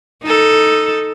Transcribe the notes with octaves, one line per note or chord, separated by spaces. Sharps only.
D#4 A4